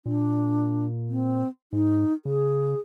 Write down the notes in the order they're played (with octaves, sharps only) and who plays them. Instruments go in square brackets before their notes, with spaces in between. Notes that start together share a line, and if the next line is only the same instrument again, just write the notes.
[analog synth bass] A#2 [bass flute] D4
[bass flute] C4
[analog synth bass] G#2 [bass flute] D#4
[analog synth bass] C#3 [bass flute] G#4